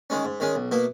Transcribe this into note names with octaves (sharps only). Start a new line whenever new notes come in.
D#3 G#3 C#4
G#2
D#3 G#3 C#4
B1
B2 A#3 E4